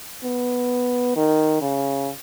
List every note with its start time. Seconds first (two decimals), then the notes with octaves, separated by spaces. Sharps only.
0.24 B3
1.16 D#3
1.61 C#3